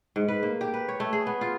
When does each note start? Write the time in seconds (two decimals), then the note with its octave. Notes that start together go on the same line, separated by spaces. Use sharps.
0.16 G#2
0.28 B4
0.43 A#3
0.61 G4
0.74 B4
0.88 C#5
1.00 A3
1.13 G#4
1.27 B3
1.41 F4